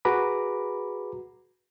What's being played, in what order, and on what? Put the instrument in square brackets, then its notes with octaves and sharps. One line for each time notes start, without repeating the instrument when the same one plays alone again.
[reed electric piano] F#4 G#4 B4 A#5 B5 D6